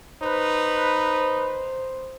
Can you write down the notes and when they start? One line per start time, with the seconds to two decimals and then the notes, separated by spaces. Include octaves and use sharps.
0.23 D#4 B4 C5